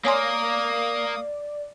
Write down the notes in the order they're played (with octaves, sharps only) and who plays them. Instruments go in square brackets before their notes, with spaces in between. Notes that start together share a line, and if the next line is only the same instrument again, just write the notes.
[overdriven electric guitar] A#3 A#4 [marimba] C#5 G#5 C6 [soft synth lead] D5 [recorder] D#6